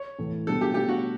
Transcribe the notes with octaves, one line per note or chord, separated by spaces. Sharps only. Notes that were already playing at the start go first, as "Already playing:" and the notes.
Already playing: C#5
A2 E3 A3
B2 G3 D4 A4
G4
B2 A3 D4 G4
F#4